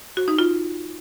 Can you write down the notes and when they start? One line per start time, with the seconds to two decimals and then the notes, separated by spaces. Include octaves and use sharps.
0.17 F#4
0.28 D#4
0.39 F4